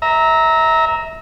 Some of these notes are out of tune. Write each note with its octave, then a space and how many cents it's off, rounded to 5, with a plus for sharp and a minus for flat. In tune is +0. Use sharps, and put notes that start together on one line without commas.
E5 -25 A#5 +0